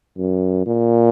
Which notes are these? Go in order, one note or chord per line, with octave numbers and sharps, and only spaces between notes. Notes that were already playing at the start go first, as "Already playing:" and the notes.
F#2
A#2